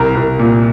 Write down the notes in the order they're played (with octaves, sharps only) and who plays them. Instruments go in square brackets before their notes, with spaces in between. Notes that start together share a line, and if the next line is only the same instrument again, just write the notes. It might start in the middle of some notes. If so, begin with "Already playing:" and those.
Already playing: [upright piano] C2 A#4 A#5
C2
A#2